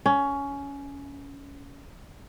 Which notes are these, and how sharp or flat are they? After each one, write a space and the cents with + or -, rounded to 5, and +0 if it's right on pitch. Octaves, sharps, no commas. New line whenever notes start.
C#4 +15